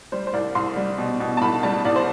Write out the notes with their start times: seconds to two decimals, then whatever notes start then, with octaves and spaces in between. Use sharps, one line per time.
0.12 G3 C5
0.27 C5
0.33 C2 D5
0.55 C2 C6
0.76 G3
0.98 B2
1.20 B2
1.37 A5
1.41 C2 B5
1.63 G3 A5
1.85 C2 D5
1.96 C5